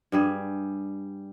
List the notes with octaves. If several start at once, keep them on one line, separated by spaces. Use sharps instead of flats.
G2 G3 G#4